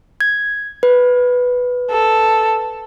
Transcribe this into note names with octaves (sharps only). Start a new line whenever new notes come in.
G#6
B4
A4